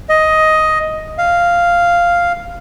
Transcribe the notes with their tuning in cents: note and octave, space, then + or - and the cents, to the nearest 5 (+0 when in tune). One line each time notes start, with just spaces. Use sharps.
D#5 +10
F5 -5